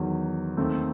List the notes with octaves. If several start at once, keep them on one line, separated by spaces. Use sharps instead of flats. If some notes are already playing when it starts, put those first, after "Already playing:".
Already playing: E2 D#3 F#3
D#2 D#3 A3 C4